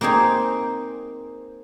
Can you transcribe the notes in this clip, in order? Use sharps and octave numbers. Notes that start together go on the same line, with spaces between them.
A#3 C4 D#4 G#4 C5